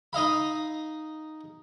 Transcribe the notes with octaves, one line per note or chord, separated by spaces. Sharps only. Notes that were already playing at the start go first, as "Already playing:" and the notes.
D#4 D#5 F5 B5